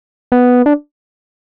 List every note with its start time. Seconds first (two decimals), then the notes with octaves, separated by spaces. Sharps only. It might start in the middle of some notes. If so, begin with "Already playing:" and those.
0.32 B3
0.66 D4